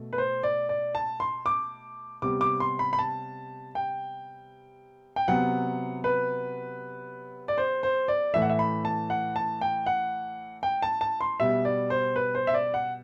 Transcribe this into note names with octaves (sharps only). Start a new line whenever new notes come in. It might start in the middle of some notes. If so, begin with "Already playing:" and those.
Already playing: B2 A3
B4
C5
D5
D5
A5
C6
D6
C3 G3 B3 D6
D6
C6
B5
B5
A5
G5
G5
C3 F#3 B3 F#5
B4
D5
C5
C5
D5
A2 E3 A3 E5
F#5
E5
B5
A5
F#5
A5
G5
F#5
G5
A5
A5
C6
B2 G3 B3 E5
D5
C5
B4
C5
E5
D5
F#5